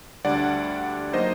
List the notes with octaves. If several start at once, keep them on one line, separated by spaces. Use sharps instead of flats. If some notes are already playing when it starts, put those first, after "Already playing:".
D2 D3 G3 D4 D5 F#5
F#3 A#3 D#4 C5 D#5